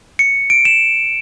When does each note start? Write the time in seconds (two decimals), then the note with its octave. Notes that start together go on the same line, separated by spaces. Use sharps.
0.19 C#7
0.50 D7
0.65 E7